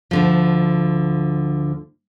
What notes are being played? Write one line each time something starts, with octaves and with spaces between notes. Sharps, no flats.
D2 D3 F3